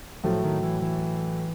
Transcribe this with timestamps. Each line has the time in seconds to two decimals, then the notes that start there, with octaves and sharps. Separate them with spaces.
0.24 A2 F3 F#3 A3
0.44 D#3
0.63 E3
0.82 E3